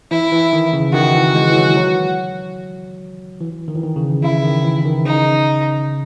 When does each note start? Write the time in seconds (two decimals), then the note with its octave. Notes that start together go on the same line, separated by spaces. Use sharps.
0.11 E3 E4
0.32 E3
0.53 D#3
0.73 C#3
0.94 D#3 F#4
1.14 E3
1.35 G#3
1.49 E3
1.56 F#3
1.76 F#3
3.40 E3
3.68 D#3
3.75 E3
3.84 D#3
3.96 C#3
4.23 C#3 E4
4.43 D#3
4.64 E3
4.85 D#3
5.05 C#3 D#4